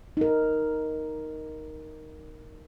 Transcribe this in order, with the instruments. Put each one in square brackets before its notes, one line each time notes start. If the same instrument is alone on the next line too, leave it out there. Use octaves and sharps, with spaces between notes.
[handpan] D#4 A#4